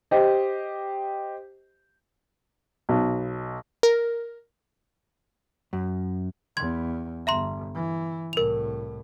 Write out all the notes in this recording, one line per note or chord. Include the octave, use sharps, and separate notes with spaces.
G4 C5 D#5
B1
A#4
F#2
E2 C6 G#6
G1 E5 A#5 C6
E3
C2 A2 A#4 F7